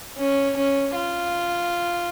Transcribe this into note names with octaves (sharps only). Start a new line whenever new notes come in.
C#4
C#4
F4